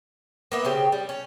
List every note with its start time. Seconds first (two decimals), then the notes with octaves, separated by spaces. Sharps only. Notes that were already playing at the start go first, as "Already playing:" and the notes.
0.52 A#3 B3 E5
0.65 C#3 C4 G4
0.92 G3
1.09 C#4